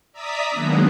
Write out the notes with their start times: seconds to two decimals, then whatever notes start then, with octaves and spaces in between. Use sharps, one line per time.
0.13 D5 E5 A#5 D#6 B6
0.50 D#3 F#3 G#3 A#3 B3 D4